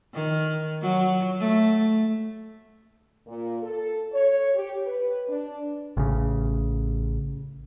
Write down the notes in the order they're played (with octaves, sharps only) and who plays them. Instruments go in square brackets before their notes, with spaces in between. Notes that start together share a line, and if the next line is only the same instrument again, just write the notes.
[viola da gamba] D#3
F#3
A3
[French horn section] A#2
A4
C#5
G4
B4
D4
[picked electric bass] A1 C#3